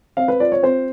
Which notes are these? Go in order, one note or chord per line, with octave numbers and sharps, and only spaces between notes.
C4 F5
B4
F4 D5
C#5
C4 C5